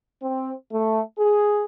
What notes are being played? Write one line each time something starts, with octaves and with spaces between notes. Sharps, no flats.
C4
A3
G#4